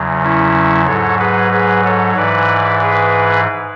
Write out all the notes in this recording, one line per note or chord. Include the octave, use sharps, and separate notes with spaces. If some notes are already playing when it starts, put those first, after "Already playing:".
Already playing: E2 C#3 F#3
C#4 E4
G#2 F#3 A4 C#5
G#4 B4
G#4 B4
A4 C#5
G#2 E3 B4 D5
G#4 B4